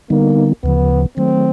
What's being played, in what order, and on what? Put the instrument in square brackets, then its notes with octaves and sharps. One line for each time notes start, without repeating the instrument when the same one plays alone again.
[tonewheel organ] D3 G3 B3 D#4 [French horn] A#3
[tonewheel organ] D2 C#3 F3 [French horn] B3
[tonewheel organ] D#3 F#3 A3 [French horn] C4